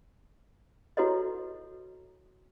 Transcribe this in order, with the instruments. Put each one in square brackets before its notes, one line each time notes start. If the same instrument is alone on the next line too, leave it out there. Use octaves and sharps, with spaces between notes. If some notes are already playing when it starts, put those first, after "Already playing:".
[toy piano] E4 F#4 A4 B4 C#5 D#5